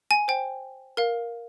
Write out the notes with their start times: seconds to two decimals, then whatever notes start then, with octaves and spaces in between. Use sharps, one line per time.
0.11 G#5
0.28 C5 G5
0.97 A#4 F5